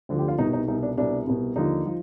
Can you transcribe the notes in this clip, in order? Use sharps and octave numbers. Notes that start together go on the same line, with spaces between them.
D2 D3 F3
G4
F4
C2 B2 D#4
D#4
C2 B2 D#4
D4
C2 B2 D4
C2 B2
D#2 D3 F3 D#4
F3